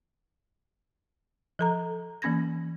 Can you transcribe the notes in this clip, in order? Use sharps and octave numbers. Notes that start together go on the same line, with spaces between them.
F3 A4 A#5
E3 A#3 C#4 G#6 A#6